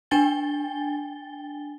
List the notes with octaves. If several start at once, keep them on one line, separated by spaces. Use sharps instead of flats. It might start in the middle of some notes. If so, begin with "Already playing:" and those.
D4 G5 G#5 A6 G7